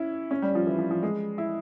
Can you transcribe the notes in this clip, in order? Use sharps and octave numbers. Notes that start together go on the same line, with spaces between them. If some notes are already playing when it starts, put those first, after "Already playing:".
Already playing: C#4 E4
C#4
G3
F3
E3
F3
F3
G#3
E4